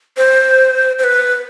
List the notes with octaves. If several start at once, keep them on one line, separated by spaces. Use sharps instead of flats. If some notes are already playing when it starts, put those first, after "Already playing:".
C5
C5
B4